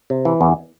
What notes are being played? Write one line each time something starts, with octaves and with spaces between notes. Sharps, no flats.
C3
E3
E2